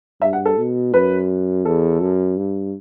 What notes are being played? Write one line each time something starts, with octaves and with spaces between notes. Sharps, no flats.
G2 E5
F#5
A4
B2
F#2 B4
E2 A4
F#2
G2